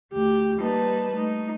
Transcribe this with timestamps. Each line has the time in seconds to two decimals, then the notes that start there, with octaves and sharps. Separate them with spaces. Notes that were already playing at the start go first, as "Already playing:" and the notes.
0.14 D2 A3 G4
0.58 G3 A#3 D#4 B4 A5
1.15 A3 D#4